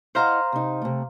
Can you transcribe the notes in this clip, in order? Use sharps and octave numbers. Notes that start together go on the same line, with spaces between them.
E4 C5 D#5 F5 F#5 A#5
C3 D#4
C3 A3